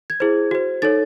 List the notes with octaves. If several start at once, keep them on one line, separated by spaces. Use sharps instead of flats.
G#6
E4 G#4 C5
F#4 C5
D#4 A4 C#5 A6